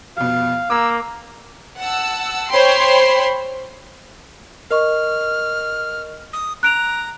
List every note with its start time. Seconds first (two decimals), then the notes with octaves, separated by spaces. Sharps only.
0.17 F1 B2 F5
0.70 A#3 D6 E6
1.79 F#5 A5 E6
2.50 C5 C#5 G5 B5 C6 C7
4.71 A#4 D#5 C#6 F6
6.33 D#6
6.63 A#5 F#6 D7 F7